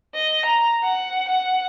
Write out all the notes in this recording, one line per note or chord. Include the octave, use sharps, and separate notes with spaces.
D#5
A#5
F#5
F#5